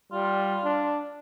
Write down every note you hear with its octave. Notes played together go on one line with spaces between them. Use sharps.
G3 F4
D4